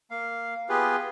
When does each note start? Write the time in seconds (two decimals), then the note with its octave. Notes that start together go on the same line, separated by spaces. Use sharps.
0.11 A#3 F5
0.69 B3 F4 G4 G#4 B4